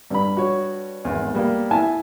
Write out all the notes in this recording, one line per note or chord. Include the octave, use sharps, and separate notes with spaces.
G2 B5
F#4 C#5
G#1 E2
G3 A#3 B3
E4 G#5 A5